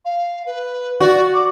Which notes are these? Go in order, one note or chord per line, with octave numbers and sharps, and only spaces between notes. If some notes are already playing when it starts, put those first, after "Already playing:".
F5
B4
F#4 D5
D6